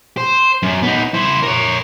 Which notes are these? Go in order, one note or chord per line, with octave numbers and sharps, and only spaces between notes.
C5
F#2
B3 D#4
E4 C5
A#4 C#5